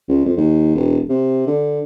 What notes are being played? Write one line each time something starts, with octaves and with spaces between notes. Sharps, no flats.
C#2
F2
D#2
E1
C3
D3